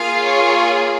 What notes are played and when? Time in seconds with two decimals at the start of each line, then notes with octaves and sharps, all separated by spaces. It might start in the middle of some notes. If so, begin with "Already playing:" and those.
Already playing: A#3 F4 G#4 F5
0.23 C#5